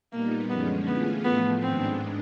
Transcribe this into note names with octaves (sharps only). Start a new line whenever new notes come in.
A#2 G3 A#3 B3 D#4
F#2 D3 F3 G#3 B3 C#4
E3 A3 B3 C#4 F4 G#4
A2 F3 A3 B3
G#2 D#3 G#3 B3 C4 D4